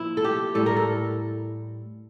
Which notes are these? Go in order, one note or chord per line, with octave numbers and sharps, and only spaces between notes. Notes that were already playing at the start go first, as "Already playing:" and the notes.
Already playing: A#2 F3 E4
A4
G4
A2 G3 A4
A#4
A4